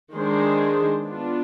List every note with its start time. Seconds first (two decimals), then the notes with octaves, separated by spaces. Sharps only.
0.14 D#3 G#3 D4 G#4 C5
1.05 B3 D4 F4